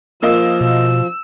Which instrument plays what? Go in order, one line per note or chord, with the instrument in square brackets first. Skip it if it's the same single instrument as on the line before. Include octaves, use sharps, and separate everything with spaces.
[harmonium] F3 [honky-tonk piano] A#3 F4 D#5 [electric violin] E6
[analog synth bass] B2 [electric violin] E6